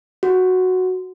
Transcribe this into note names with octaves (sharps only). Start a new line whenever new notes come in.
F#4